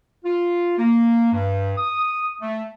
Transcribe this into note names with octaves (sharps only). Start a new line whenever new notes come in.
F4
A#3
G2
D#6
A3